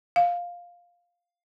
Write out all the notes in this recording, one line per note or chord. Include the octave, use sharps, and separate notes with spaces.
F5